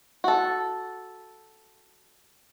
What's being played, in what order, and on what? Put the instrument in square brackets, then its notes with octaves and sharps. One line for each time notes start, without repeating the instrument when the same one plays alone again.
[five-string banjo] F#4 A4